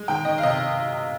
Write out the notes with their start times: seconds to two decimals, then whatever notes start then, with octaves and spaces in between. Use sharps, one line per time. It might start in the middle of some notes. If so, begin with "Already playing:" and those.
Already playing: G#3
0.08 D#3 G5
0.25 D#3 D#5
0.38 F5
0.43 C3 D#5